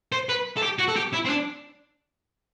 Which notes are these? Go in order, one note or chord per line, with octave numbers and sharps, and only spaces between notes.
C5
B4
A4
G4
F#4
A4
G4
E4
C4
D4